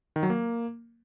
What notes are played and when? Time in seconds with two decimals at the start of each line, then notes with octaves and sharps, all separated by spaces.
0.16 D#3
0.23 F#3
0.30 A#3